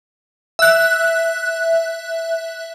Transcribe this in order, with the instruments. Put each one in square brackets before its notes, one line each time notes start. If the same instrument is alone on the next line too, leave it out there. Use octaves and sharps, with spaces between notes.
[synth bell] E5 F#6